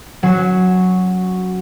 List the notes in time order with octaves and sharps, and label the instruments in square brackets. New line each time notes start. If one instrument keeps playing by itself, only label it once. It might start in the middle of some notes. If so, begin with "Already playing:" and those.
[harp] F#3 C#4 F#4 C7 E7